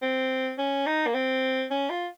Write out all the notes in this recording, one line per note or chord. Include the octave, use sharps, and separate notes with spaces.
C4
C#4
D#4
A#3
C4
C#4
F4